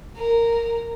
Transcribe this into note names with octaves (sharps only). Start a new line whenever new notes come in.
A#4